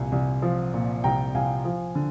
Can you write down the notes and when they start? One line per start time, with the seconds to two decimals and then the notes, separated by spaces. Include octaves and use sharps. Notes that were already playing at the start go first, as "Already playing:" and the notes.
Already playing: C2 A#2 G#5
0.12 C2
0.42 F3
0.74 A#2
1.04 C2 G5 A#5
1.35 C2 F5 G#5
1.65 F3
1.95 D3